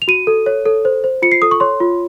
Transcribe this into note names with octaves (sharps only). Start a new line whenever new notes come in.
F7
F#4 D#7
A4
C#5
A4
C5
C5
F4 C#7
C7
A4 D#6
C#6
C#5 C6
F4